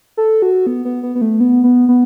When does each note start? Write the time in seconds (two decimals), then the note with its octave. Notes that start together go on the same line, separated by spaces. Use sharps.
0.17 A4
0.42 F#4
0.67 B3
0.85 B3
1.03 B3
1.15 B3
1.21 A3
1.40 B3
1.64 B3
1.89 B3